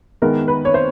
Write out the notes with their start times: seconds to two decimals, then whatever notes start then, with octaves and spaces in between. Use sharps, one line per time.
0.22 D#3 G#3 B3 A#4
0.48 B4
0.65 C#5
0.74 C5